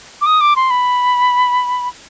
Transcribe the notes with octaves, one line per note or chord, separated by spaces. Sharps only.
D6
D#6
D6
C6
B5